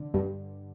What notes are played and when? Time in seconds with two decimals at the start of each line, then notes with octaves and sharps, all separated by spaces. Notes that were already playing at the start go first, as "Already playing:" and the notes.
Already playing: D3
0.14 G2